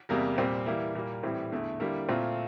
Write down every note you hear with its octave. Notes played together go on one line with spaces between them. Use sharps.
E2 C3 G3 A#3
A#2 G3 C4
E3 G3 A#3 E4
A#2 G3 A#3
A2 E3 G3 C4
E2 D3 A3 E4
D3 G3 A#3 E4
A#2 A3 C4 F4